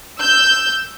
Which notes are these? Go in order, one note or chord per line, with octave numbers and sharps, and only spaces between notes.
E6 G6